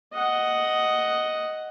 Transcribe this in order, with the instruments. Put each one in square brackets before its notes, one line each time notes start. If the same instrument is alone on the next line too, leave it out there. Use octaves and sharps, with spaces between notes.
[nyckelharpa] D#5 F#5